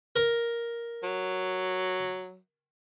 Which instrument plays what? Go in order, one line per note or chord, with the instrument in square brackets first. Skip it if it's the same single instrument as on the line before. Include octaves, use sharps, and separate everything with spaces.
[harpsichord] A#4
[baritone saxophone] F#3